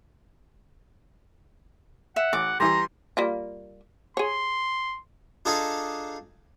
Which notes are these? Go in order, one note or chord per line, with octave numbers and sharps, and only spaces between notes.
E5 F#5
A1 D6
E3 G3 A#5 C6
G3 A#3 F4
G#4 C#5 C6
D4 D#4 F4 G#4 A4